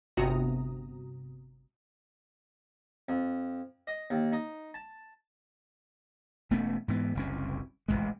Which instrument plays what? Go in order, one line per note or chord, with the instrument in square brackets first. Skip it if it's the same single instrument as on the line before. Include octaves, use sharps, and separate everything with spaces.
[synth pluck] G1 C3 F#4 A#5 D#6
[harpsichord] F2
D#5
D#2
D#4
A5
[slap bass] E1 A3 B3 C#4
G#2 E3 B3
F#1 C2 C#4
D#1 A1 D#2 G#3